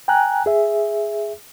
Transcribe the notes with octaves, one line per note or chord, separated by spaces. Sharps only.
G5 G#5 A#5 F#6
G#4 E5